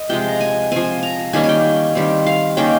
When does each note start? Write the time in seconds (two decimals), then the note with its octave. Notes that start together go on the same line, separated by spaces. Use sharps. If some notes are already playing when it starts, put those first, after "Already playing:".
Already playing: D#5
0.09 C3 F3 G#3 G5
0.29 A#5
0.41 G#5
0.72 F3 C4 G#5
1.03 A#5
1.33 D#3 G3 A#3 C#4 G#5
1.44 G#5
1.49 G5
1.95 D#3 G3 C4
2.26 F5
2.57 D#3 A#3 C#4 G5